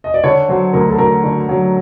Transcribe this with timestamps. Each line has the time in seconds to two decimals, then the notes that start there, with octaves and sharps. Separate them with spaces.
0.04 D#5
0.14 D5
0.24 D3 C#5
0.48 F#3 C5
0.73 D2 A#4
0.90 A4
0.98 D2 A#4
1.24 D3
1.49 F#3